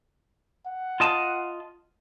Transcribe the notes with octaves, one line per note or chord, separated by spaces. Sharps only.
F#5
F4 D#5 A5